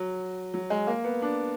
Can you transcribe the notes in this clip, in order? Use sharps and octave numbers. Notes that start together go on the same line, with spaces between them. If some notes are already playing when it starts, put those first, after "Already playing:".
Already playing: F#3
F#3
G#3
A#3
B3
D4